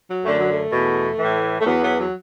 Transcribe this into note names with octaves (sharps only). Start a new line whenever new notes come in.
F#3
F#2 D3 A3
F#3
A3
E2 B2
A2 E3
A3
E2 E3 F#3 B3
F#3 B3
F#3